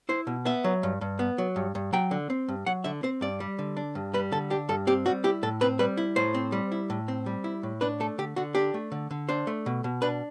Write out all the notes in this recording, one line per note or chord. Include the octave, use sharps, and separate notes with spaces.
E4 C5
B2
B3 E5
F#3
G2
G2
B3
F#3
G2
G2
F#3 G5
D3
C4
G2
F#3 F#5
D3 E5
C4 C5
G2 D5
G3
D3
D4
G2
G3 B4
D3 A4
D4 G4
G2 A4
C4 G4
G3 F#4
E4 G4
A2 A4
C4 B4
G3 B4
E4
A2 C5
C4
G3
E4
A2
C4
G3
E4
A2
D4 B4
A3 A4
D3 G4
D3 F#4
D4 G4
A3
D3
D3
D4 C5
A3
B2
B2
D4 B4